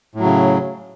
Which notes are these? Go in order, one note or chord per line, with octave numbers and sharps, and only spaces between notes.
A2 C#3 F#3